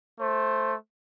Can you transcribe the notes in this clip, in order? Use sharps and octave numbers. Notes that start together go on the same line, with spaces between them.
A3 C5